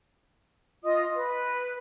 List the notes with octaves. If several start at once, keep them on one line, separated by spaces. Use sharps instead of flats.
F4 D#5 D#6
B4